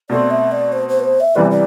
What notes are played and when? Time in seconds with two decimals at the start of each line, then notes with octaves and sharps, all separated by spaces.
0.10 B2 A3 C4 D5
0.30 E5
0.51 D5
0.72 C5
0.88 C5
0.99 B4
1.03 C5
1.20 E5
1.35 C2 C3 E3 G3 B3 D5
1.51 D5